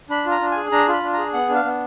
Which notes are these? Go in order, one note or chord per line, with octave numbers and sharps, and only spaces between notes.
D4 B5
F4
A#5
D4
G#5
G#4
D4 A#5
F4 B5
D4
G#4 A#5
B3 F#5
D4
F5
B3